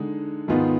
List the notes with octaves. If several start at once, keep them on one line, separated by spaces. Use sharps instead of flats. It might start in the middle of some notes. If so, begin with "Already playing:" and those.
Already playing: D3 G#3 D#4
G#2 D#3 G#3 B3 F4